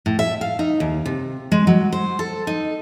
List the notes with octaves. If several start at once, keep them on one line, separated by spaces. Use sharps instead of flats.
A2
E5
F5
D#4
D#2
C3
G#3
F#3
C5
A4
D#4